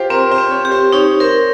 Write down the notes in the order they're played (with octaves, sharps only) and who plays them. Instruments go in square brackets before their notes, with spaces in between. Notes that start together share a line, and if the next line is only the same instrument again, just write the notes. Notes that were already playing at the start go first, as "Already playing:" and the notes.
Already playing: [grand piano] F4 G4 [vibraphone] C5
[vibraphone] C4 [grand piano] A#4
[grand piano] C5
[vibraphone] C4
[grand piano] C#5
[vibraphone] G4
[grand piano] C5
[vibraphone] D#4 [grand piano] C#5
[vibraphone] A#4 [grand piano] C5